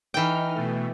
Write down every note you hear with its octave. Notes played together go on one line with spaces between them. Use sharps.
E3 D#4 G5 F6
B2 A3